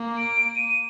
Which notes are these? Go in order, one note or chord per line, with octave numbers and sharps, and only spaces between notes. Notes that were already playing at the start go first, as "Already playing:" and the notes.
Already playing: A#3
D7
D#7